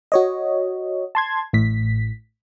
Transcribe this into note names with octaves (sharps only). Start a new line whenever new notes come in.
F#4 C#5 D#5
A5 C6 G#6
A1 A2 B6